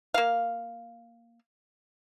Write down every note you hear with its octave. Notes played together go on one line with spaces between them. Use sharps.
A#3 F5